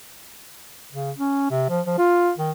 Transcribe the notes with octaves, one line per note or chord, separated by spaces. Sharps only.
C#3
C#4
C3
F3
F3
F4
D#3